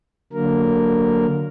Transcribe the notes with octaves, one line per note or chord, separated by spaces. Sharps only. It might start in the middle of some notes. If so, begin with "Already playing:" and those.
D3 F#3 A#3 A#4